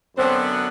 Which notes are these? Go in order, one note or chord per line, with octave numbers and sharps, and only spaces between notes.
F#2 D3 F#3 B3 C4 D4 C5